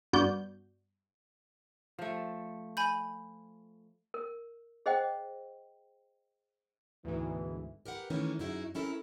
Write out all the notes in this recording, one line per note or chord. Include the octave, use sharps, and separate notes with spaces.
G2 B3 F#4 D5 G6
F3 A3
G#5 B5 G6
A#4
G#4 C5 D#5 F#5 G5
D2 G#2 B2 E3
G4 A#4 B4 F#5
D#3 E3 A3 B3 C#4 E4
F#2 D#4 E4 F#4 G#4
C4 C#4 E4 A4 A#4